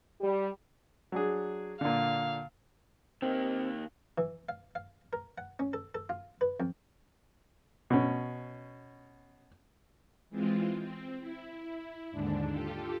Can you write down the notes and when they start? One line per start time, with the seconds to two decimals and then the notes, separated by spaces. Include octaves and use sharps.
0.21 G3
1.12 F#3 D4 G#4
1.81 A#2 D3 F5
3.22 D#3 A#3 C4
4.18 E3
4.49 F5
4.75 F5
5.13 A#4
5.38 F#5
5.59 C#4
5.73 A4
5.95 A4
6.09 F4
6.41 B4
6.60 F2
7.90 B2 C#4
10.29 E3 G#3 C4 F4
10.79 C4
11.19 E4
12.11 D#2 G#2 D3 D4
12.48 F4 G4 A4